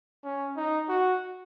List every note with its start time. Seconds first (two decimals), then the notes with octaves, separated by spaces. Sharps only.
0.24 C#4
0.56 D#4
0.89 F#4